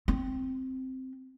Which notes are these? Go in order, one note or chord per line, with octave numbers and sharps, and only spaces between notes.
C4